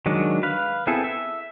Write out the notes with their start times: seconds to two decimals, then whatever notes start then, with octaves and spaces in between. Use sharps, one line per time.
0.06 D#3 F#3 G#3 D4
0.43 B4 F5
0.87 B3 C4 E4 G#4 A4
1.04 E5